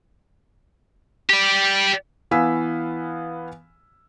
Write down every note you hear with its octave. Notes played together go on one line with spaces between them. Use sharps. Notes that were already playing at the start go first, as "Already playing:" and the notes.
G4 D5
E3 B3 F5 G#5 E6 B6